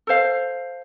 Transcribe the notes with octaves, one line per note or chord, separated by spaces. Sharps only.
A4 C5 F5